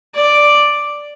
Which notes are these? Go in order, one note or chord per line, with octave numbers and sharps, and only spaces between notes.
D5